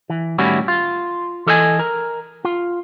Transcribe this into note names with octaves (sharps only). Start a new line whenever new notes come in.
E3
A2 D#3 G3 C#4 E4 F#4
F4
E3 A4 D#5 E5 G#5
A#4
F4